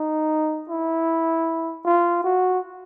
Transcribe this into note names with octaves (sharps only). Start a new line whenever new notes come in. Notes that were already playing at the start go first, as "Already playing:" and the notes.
Already playing: D#4
E4
F4
F#4